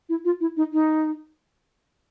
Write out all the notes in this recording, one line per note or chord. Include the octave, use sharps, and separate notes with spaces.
E4
F4
E4
D#4
D#4